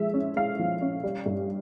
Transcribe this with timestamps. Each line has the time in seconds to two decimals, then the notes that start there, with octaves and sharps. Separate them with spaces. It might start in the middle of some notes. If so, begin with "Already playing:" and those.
Already playing: F3 G#3 E5
0.14 C#4
0.36 G#3 F5
0.59 F3
0.81 C#4
1.03 G3
1.26 G2